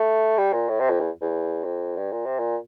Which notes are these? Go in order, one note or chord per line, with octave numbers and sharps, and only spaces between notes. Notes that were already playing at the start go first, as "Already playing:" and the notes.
Already playing: A3
G3
A#2
A2
C3
F2
E2
E2
F2
G2
A#2
C3
A#2